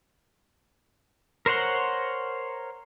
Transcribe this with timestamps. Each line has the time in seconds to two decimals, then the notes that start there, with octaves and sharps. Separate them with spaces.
1.46 A#4 C5 C#5 F#5 C6